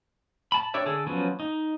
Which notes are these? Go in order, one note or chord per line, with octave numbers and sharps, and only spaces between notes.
A5 B5
D4 G4 C#5 D5 E5
D3 G#4 A4
F3 F#3 B3 C#4
D#4